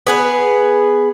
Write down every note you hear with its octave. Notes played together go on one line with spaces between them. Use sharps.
B3 G#4 B4